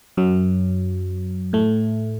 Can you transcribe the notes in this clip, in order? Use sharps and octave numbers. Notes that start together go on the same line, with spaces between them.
F#2 F#3
A2 A3